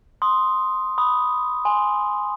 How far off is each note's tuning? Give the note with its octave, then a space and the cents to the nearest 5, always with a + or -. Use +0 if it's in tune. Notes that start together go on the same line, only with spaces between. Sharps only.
C6 +0 D#6 +0
B5 +0 D#6 +0
G#5 +0 C6 +0